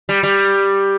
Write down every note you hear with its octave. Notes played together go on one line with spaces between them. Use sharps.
G3
G3